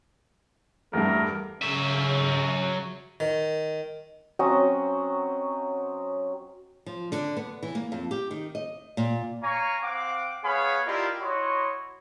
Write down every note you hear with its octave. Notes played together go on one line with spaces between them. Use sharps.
E2 G2 A3 A#4
C#3 F#3 E5
D#3
F#3 C4 C#4 D#5
F3
D3
B3
E3
A#3
F2
G4
D#3
D#5
A#2
C#5 F5 G#5 A#5 C#6
C4 F5 F#5 D6
B3 G#4 C#5 F5 G#5 B5
E4 F4 G4 A#4 D5 D#5
E4 F#4 C#5 D#5 B5 C6